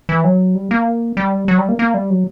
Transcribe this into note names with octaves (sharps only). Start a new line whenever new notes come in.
E3
F#3
G3
A#3
G3
F#3
G3
A#3
A#3
G3
F#3